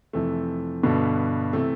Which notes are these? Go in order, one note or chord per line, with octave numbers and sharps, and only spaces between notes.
F2 C3 E3 A3
G2 B2 D3 B3
C3 E3 A3